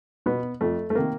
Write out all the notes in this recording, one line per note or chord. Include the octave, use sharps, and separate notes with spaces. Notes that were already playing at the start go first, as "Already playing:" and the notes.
B2 B3
F2 A3
A3
C3 D#3 A#3